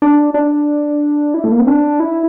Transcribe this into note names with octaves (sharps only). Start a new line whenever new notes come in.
D4
D4
E4
A3
A#3
C4
D4
E4